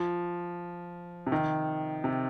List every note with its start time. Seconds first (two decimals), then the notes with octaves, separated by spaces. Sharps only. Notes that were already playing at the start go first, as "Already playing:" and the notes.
Already playing: F3
1.27 C3
1.32 D#3
2.04 C3